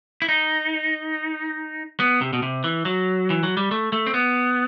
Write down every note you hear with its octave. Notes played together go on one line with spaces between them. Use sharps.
E4
D#4
B3
C3
B2
C3
E3
F#3
E3
F#3
G3
A3
A3
C4
B3